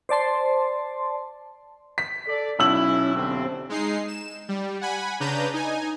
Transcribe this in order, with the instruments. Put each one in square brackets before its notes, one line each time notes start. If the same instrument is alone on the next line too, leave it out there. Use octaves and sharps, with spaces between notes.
[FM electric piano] C5 D5 A5 C6
[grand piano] B6
[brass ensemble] A4 D5
[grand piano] B1 E6 F#7 [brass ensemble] C#4 E4
[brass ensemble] G1 C3 C4
[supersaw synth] G#3 D#4 C7
E7
G3
F#5 G#5 B5
C#3 D4 B4 A#5 G6 D#7
D#4 G#5